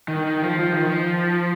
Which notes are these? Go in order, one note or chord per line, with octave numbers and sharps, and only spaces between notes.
D#3
D#3
F3
F3
D#3
F3